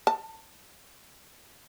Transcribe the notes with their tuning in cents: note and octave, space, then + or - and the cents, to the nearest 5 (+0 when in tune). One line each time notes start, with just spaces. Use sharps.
A5 +30